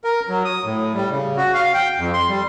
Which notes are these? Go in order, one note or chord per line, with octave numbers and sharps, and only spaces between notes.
A#4
F#3
D#6
A2
G3
C#3
F#4
F5
G5
F2
C6
G3